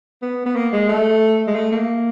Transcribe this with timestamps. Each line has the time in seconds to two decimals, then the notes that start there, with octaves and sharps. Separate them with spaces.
0.22 B3
0.46 B3
0.56 A#3
0.73 G#3
0.89 A3
1.47 G#3
1.55 A3
1.72 A#3